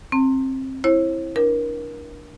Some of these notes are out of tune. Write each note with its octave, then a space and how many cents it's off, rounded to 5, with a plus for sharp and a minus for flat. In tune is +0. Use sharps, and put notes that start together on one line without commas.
C4 +20 A#5 -45
E4 +0 C5 +45
D4 +0 A#4 +30